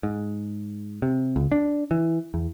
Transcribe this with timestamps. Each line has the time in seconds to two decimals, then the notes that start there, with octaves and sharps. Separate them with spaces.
0.03 G#2
1.02 C3
1.36 C#2
1.52 D4
1.91 E3
2.34 E2